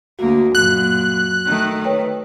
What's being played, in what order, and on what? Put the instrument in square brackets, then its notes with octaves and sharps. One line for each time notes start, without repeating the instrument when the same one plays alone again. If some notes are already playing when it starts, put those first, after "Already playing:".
[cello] D2 A#3 [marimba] F#4
[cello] F#2 A#2 [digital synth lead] F#6
[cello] D#3 A3
[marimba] B4 C#5 G5